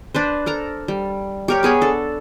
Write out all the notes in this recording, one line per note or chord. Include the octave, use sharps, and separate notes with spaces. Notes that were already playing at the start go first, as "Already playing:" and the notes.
D4 B4 C5
A4 A#4 A#5
G3
G4 A#4 C#5
B3 G#4 C#5 B5
D4 A4